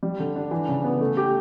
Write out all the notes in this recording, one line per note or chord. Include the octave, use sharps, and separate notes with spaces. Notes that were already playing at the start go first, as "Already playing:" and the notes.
G3
D3
D4
E3
C#3
B3
A3
G4